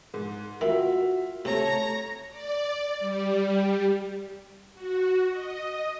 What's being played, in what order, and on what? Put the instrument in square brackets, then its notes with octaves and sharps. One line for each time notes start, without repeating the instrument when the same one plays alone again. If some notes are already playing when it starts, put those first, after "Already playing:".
[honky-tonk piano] G#2
[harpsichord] D#3 [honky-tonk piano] F4 E5 [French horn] F#4
[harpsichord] C3 [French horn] A3 [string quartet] C#5 A#5
[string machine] D5
G3
F#4
D#5